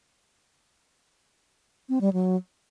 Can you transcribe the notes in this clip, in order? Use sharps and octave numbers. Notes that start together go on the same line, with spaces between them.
C4
G3
F#3